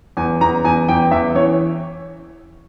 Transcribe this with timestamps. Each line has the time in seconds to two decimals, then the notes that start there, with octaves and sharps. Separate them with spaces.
0.17 E2 G#5
0.41 E2 A#5
0.65 E2 G#5
0.89 E2 G5
1.11 E2 E5
1.35 E3 C#5